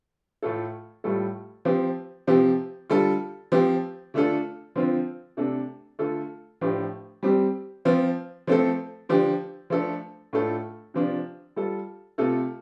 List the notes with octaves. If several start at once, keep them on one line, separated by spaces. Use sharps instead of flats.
A2 A3 F4 A4
A2 G3 F4 A4
F3 C4 G4
C3 F3 C4 G4
D3 G3 F4 A4
F3 C4 G4
D3 A3 D4 F4 A4
D3 F3 C4 F4
C3 A3 D4 A4
D3 A3 F4 A4
A2 F3 D4 G4
G3 C4 G4
F3 C4 F4
F3 A3 C4 A4
D3 F3 D4 G4
F3 A3 D4 A4
A2 A3 D4 F4 A4
C3 F3 D4 F4
G3 F4 A4
C3 A3 F4 A4